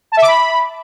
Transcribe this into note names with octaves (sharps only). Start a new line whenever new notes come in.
A5
E5
D6
B5